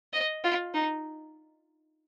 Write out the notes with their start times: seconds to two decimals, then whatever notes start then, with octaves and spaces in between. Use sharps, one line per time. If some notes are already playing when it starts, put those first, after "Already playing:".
0.13 D#5
0.44 F4
0.74 D#4